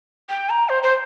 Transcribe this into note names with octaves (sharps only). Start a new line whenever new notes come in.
G5
A#5
C5
C5